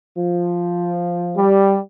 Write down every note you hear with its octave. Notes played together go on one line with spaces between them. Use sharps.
F3
G3